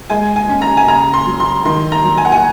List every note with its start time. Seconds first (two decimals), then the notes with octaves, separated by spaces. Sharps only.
0.10 G#3 G#5
0.36 G#5
0.49 C#4
0.62 A#5
0.77 G#5
0.88 C#3 A#5
1.14 C6
1.27 F#3
1.40 C6
1.65 D#3 C6
1.92 A#5
2.05 F#3
2.18 G#5
2.25 F#5
2.32 G#5